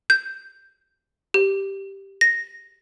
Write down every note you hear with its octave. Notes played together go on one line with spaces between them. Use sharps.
G6
G4
A#6